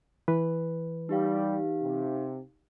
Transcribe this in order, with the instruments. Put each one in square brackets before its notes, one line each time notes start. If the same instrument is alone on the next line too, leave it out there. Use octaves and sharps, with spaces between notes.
[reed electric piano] E3 B4
[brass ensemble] G3 [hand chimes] D#4 G4 F5
[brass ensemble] C3